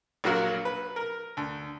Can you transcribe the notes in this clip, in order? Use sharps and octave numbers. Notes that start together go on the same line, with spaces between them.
A#1 F#2 F#3 A#3 F#4 A#4
B4
A#4
D2